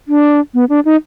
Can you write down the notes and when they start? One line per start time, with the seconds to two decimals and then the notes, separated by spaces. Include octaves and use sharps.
0.08 D4
0.54 B3
0.69 D4
0.85 D#4